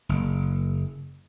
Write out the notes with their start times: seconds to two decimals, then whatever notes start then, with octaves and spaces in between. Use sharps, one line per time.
0.09 F#1